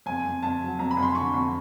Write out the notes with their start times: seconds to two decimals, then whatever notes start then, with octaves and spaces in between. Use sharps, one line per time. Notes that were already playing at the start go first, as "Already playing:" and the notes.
0.06 F2 G#5
0.25 F2
0.43 F2 A5
0.61 F#3
0.79 F2 A#5
0.91 B5
0.97 F2
1.02 C6
1.15 D3 C#6
1.34 F2